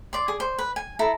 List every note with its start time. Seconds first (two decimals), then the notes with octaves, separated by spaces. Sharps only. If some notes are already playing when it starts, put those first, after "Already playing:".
0.13 D5 C6
0.28 G#4
0.40 C5
0.58 B4
0.76 G#5
0.99 E4 A4 A#5